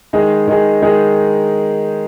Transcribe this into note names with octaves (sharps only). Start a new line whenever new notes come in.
D#3 G#3 D#4 G#4
D#3 G#3 D#4 G#4
D#3 G#3 D#4 G#4